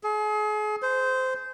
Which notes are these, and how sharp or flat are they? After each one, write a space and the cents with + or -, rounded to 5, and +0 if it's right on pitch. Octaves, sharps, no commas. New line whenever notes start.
G#4 +35
C5 -15